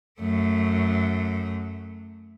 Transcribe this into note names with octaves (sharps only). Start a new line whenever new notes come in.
F#2 A3